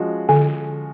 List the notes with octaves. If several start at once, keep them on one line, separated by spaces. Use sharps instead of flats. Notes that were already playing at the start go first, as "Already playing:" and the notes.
Already playing: F3 G#3 C#4 F#4
D3